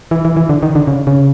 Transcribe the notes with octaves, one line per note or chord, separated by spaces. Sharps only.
E3
E3
E3
D3
D#3
D3
C#3
C#3